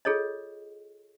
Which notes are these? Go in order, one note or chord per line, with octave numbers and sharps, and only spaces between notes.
F4 G#4 A4 C#5 D#5